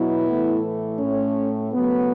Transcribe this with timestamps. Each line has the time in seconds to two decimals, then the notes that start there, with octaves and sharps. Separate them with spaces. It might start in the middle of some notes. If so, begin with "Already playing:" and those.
Already playing: B2 F#3 B3 E4
0.26 A2 E3 A3
1.00 A2 A3 C#4
1.74 C#3 F#3 A3 B3